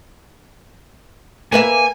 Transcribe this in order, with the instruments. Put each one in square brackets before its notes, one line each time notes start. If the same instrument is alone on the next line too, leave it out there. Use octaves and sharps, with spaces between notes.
[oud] A#3 B4 E5 [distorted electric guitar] G#5